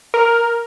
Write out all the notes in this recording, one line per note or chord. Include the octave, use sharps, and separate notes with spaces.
A#4